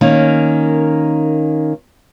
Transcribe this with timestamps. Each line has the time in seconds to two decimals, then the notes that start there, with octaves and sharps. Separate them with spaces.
0.01 D#3 A#3 C#4